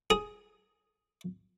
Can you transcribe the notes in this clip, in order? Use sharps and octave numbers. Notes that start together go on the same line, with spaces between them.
G#4